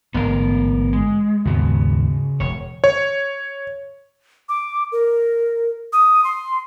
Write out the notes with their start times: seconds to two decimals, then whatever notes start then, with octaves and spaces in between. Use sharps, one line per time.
0.14 A1 G#2 D3 B3 A#4
0.93 G#3
1.45 D#2 G#2 C#3 B3 F#4
2.40 E1 C#5
2.84 C#5
4.49 D6
4.92 A#4
5.93 D#6
6.24 C6